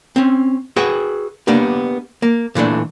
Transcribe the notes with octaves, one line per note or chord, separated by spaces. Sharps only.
C4 C#4
F#4 G#4 B4 G5
A#3 B3 D4 G4
A#3
A#2 E3 A3 D4